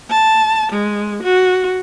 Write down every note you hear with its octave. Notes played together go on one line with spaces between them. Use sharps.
A5
G#3
F#4